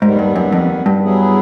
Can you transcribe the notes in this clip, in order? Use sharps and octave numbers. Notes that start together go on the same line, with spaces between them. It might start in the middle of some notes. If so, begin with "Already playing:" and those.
D#2 G#2 D#3 G3 B3
G2
F#2
F2
G2
F#3 B3 E4 G#4